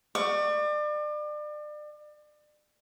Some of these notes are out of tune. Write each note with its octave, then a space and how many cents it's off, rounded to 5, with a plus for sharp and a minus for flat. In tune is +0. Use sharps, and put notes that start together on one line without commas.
D5 +35 C#6 +20